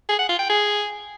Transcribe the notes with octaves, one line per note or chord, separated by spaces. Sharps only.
G#4
F#5
F4
G5
G#4